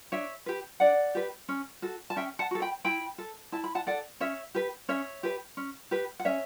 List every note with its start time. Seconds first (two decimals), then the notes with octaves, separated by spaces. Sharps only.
0.12 D4 C#5 E5
0.46 G4 B4
0.80 D4 D5 F#5
1.15 G4 B4
1.49 C#4
1.82 F#4 A4
2.10 A5
2.16 C#4 E5 G5
2.39 F#5 A5
2.51 F#4 A4
2.62 G5 B5
2.85 E4 G5 B5
3.18 A4
3.52 E4 A5
3.64 B5
3.75 F#5 A5
3.87 A4 D5 F#5
4.20 C#4 C#5 E5
4.55 G4 B4
4.89 C#4 C#5 E5
5.23 G4 B4
5.57 C#4
5.91 G4 B4
6.20 F#5
6.25 C#4 C#5 E5